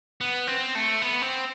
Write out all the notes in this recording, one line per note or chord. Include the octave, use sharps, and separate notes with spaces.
B3
C4
A3
B3
C4